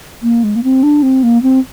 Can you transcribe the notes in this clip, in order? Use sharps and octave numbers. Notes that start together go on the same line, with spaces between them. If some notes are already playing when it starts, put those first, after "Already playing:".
A#3
G#3
A#3
C4
D4
C4
A#3
C4